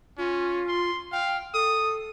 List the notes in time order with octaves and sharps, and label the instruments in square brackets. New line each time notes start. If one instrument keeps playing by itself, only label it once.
[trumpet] C#4 [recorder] F4
[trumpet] C6
[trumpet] F5 [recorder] G5
[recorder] A4 [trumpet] D#6